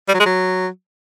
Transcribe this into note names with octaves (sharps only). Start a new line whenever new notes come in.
G3
F#3
G#3
F#3